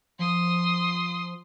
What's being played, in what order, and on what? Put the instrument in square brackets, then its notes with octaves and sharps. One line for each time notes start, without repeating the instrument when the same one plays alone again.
[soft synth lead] F3 [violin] C6 D#6